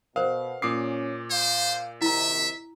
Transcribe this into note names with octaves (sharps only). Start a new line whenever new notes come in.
B2 A#4 C5 F5
A#2 C#4 D6 D#6 C7
C5 F5
C3 D#3 E4 E5 A#5